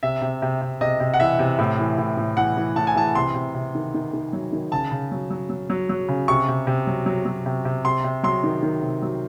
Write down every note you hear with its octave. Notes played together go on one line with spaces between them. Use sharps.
C3 E5
C3
C3
C3
C3 D#5
C3
F#5
E3 E5
C3
A2
E3
A2
A2
E3 F#5
E3
A2 A5
G#5
E3 A5
C3 C6
C3
C3
D#3
D#3
D#3
F#3
D#3
C#3 A5
C#3
F#3
F#3
F#3
F#3
F#3
C#3
C3 C#6
C3
C3
F#3
F#3
F#3
C3
C3
C3 C6
C3
F#3 C6
D#3
D#3
C3
F#3